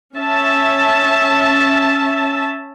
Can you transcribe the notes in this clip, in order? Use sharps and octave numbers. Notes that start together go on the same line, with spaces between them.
C#4 E5 A5